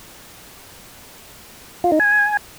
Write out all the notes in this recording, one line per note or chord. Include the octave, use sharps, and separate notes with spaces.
F4
D#4
G#5